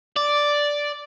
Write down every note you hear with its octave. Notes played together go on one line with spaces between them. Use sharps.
D5